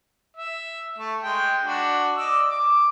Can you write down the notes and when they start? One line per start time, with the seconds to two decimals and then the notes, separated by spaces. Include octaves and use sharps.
0.37 E5
0.98 A3
1.23 G#3 G5
1.63 D4 F#4
2.17 D5 D#5 E6
2.51 D6